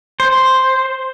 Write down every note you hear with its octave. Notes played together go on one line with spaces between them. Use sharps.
C5